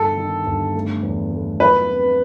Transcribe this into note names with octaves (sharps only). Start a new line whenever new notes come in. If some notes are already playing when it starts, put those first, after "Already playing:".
Already playing: G1 A4
D#3
G1
A3
E2
A3
F#3 B4
C4